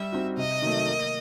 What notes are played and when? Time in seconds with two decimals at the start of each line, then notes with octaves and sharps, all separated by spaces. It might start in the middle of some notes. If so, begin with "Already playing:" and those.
Already playing: G3 E5
0.12 C4 D#4 F#4
0.37 C3 D#5
0.62 D#3 F#3 A3
0.86 A#3